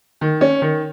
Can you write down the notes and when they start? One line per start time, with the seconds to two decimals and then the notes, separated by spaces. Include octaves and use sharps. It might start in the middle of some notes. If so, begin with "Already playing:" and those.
0.21 D#3
0.41 C#4
0.62 D#3